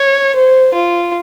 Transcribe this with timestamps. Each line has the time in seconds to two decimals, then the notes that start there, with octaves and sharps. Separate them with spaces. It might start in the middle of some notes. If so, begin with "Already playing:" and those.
Already playing: C#5
0.35 C5
0.74 F4